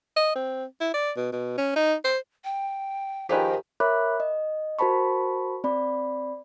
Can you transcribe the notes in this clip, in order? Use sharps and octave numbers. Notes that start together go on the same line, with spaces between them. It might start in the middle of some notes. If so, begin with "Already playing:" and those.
D#5
C4
E4
D5
B2
B2
C#4
D#4
C5
G5
D#3 F3 G4 G#4 B4 G5
A#4 C#5 E5 B5 D6 F#6
D#5
F#4 A#4 C5 A5 B5 C#6
C4 D5 B5